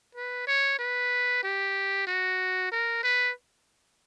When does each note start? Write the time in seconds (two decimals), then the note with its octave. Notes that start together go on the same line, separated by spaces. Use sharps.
0.15 B4
0.48 C#5
0.79 B4
1.44 G4
2.07 F#4
2.72 A#4
3.04 B4